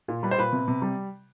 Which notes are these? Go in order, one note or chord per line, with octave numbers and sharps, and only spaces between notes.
A#2
G3 B4
C5
A#2 B4
C3
C3
G3